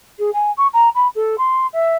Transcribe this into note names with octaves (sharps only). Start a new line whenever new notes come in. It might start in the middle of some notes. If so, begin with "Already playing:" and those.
G#4
G#5
C#6
A#5
B5
A4
C6
E5